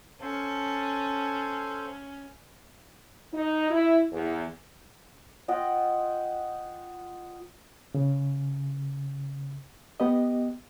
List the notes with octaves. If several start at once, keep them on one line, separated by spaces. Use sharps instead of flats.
C#4 A4 C5 F5 A5
D#4
E4
E2
F4 D#5 F#5 G5
C#3
B3 G4 D#5